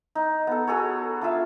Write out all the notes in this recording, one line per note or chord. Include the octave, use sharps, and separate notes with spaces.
D#4
B3 A4
F#4 G#4 A4 C#5
D4 F4 E5 F5